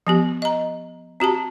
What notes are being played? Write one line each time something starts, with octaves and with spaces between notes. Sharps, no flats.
F3 B3 G4
D#5 A#5
C4 F#4 G4 A5